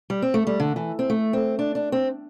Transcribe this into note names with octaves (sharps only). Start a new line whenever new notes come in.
G3
C4
A3
G3
D3
E3
C4
A3
C4
D4
D4
C4